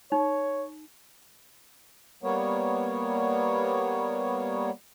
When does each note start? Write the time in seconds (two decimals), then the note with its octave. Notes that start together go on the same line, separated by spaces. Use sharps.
0.12 D#4 C#5
2.23 G3 A#3 B3 C#5